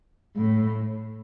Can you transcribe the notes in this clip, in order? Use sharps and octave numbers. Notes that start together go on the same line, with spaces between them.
A2